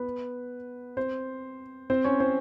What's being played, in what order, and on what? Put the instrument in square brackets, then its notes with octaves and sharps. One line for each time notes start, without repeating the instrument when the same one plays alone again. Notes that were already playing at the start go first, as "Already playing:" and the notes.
Already playing: [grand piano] B3 B4
C4 C5
C4 C5
C#4 C#5
C4 C5